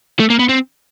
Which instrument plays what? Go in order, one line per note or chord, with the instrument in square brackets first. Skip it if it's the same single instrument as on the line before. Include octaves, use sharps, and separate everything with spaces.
[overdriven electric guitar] A3
A#3
B3
C4